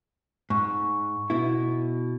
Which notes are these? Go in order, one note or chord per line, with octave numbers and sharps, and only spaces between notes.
G#2 C#6
B2 E4